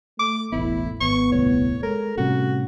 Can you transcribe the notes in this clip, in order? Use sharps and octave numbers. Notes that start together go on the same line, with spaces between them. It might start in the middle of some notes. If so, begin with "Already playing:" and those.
A3 D6
E1 A1 A2 B3 E4
G#1 B3 C#6
D#1 C2 A2 C#5
G#3 A4 A#4
A2 C3 G3 C#4 F#4